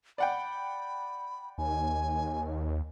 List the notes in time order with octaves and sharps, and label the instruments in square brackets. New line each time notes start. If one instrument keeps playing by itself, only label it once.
[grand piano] D5 F#5 G5 [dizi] B5
[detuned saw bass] D#2 [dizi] G#5